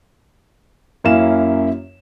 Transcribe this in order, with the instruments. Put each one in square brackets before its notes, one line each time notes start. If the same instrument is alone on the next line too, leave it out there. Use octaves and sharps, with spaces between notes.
[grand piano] F#2 A#3 C#4 E4 F5 E7